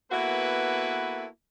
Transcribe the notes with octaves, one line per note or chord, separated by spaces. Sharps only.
A#3 B3 E4 F#4 A4 B4